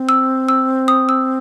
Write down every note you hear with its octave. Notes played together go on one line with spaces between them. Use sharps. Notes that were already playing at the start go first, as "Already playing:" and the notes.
Already playing: C4
E6
E6
D#6
E6